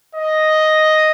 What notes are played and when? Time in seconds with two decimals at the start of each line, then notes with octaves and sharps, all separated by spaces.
0.15 D#5